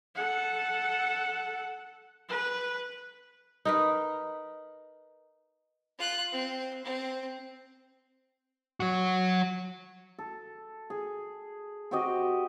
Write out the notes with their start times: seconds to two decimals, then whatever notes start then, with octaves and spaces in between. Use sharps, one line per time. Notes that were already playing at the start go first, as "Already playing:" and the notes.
0.16 A4 F#5
2.29 B4
3.65 D#4 A#4 B4
5.98 F4 F#6
6.32 C4
6.84 C4
8.80 F#3 F#4
10.19 A4
10.90 G#4
11.91 C4 F#4 G4 D#5